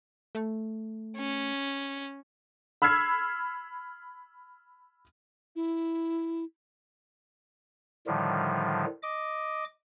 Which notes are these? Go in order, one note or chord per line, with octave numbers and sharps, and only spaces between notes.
A3
C#4
B5 E6 F6 G#6 C7
E4
A2 D3 D#3 F3 G3
D#5 D6